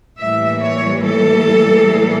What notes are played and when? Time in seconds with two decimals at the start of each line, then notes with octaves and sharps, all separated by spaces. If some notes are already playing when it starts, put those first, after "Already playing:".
0.19 A2 E3 G3 A#3 E5
0.61 C#5
1.02 A4